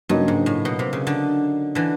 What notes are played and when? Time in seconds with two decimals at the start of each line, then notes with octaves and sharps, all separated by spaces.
0.09 G2 C#3 F#3 A#3 D#4
0.28 G#2
0.46 A2
0.65 B2
0.79 C3
0.93 C#3
1.07 D3
1.75 D3 E3